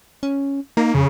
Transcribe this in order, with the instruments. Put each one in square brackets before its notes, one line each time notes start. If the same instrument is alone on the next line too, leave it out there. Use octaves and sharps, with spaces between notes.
[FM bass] C#4
[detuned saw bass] A#3 [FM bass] D#4
[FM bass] F2 [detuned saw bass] C#3